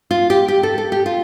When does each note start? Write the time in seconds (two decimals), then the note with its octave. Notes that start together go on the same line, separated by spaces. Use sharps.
0.11 F4
0.30 G4
0.48 G4
0.63 A4
0.78 A4
0.92 G4
1.06 F4